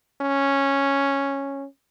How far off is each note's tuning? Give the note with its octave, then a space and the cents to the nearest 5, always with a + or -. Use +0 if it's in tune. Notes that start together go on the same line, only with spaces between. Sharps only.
C#4 -5